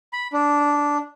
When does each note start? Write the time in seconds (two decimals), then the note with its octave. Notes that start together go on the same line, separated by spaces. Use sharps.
0.13 B5
0.33 D4